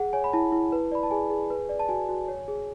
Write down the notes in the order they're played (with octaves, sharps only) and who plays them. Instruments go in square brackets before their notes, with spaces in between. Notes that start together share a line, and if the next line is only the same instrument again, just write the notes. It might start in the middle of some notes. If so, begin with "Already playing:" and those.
Already playing: [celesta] G#4 F#5
C#5 G#5
B5
E4 A5
E4
B4
D5 B5
A5
G#4 G#5
G#4
B4
D5
A5
F#4 G#5
F#4
C#5
G#4